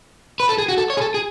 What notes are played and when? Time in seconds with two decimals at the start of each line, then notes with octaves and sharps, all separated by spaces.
0.40 B4
0.49 A4
0.58 G#4
0.68 F#4
0.77 A4
0.90 C#5
0.97 G#4
1.01 A4
1.14 G#4